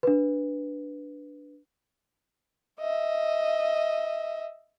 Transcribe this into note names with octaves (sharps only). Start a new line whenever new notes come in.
D4 B4
D#5 E5